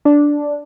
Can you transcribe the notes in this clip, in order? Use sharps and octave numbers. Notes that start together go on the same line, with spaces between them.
D4